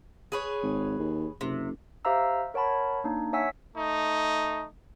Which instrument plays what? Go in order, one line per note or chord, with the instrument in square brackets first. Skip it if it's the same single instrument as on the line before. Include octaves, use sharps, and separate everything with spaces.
[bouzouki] G#4 B4 C#5
[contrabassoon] G#1
D#2
[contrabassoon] F#1 [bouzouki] C3
[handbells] G4 C5 E5 F5 A#5 E6
A#4 C#5 F#5 A5 B5
A#3 D4 D#4
C#5 E5 F#5 G#5 E6 B6
[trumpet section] A3 D#4